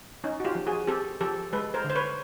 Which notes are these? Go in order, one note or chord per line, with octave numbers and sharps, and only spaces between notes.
C#4 D#4
F#4
F4 G4
F3
F#4 G#4
C4 G4 A4
F3 G4 A4
G#3 A4 B4
A#4 C5
D3
C5
B4 C#5